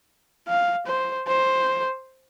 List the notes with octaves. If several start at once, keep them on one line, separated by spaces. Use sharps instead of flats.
F5
C5
C5